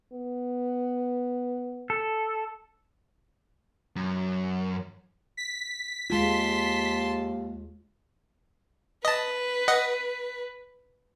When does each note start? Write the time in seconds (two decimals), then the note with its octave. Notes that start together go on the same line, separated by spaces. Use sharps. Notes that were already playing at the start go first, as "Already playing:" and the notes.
0.13 B3
1.90 A4
3.96 F#2
5.37 B6
6.10 D#2 G#3 F4 A5 C6
9.05 B4 D#5 A5
9.68 D#5 F#5